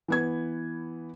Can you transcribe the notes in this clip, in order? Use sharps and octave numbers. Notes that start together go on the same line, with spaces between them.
E3 B3 G#6